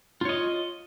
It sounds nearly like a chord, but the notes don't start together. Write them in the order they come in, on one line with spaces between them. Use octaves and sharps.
F4 C#5 D#5